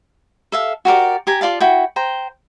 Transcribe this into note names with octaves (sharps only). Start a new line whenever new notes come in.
A4 E5 F5
F#4 G4 A#4 D5
G4 G#5 A#5
F4 D5 F5 A5
E4 F#4 G5
C5 G5 A#5